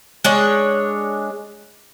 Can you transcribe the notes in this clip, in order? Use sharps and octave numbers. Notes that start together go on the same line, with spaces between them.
G#3 D4 C#5